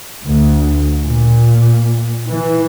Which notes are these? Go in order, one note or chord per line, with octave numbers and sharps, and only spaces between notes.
D2
A#2
E3